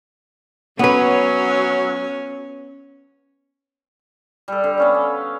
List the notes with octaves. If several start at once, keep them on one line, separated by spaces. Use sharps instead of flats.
F#3 B3 C#4 B4
G3 A4
D3
B3 C#4 F5
C#4